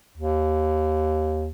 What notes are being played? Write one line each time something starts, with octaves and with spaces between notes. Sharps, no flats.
D#2